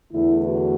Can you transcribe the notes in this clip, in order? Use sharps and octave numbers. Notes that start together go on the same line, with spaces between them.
E2 D3 A3 E4
F#4 B4